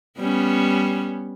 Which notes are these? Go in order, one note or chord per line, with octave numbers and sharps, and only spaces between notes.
G3 B3 C#4